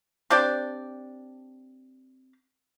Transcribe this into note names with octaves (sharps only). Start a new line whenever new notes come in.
C4 D4 G4 D5